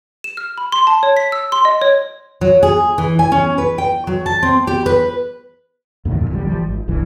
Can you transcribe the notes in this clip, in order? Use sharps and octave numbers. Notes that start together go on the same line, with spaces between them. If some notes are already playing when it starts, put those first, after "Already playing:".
E7
F6
B5
C6
A5
C#5
B6
E6
C6
D#5
C#5
F#3
G#4
E3
G#5
C#4
B4
G5
F#3
A5
C4
G4
B4
D2 G2 A#2 D#3
F2 A#2
A1 D2 E3 G3
E3 F3 G3
G#1
D#1 B1 G2 E3